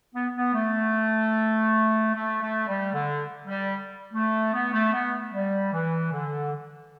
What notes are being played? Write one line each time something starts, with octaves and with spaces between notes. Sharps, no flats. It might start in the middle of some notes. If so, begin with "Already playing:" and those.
B3
B3
A3
A3
A3
G3
D3
G3
A3
B3
A3
B3
G3
E3
D3